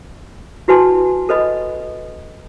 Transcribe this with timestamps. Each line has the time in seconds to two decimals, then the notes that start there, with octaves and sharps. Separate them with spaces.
0.68 E4 F#4 B4 G#5 A5 C6
1.29 A4 B4 D#5 B5